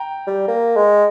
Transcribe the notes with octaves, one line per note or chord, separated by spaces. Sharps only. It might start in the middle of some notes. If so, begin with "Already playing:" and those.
Already playing: G5 A#5
G3
A#3
G#3